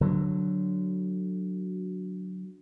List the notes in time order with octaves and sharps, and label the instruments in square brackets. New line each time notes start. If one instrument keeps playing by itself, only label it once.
[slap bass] D3 F#3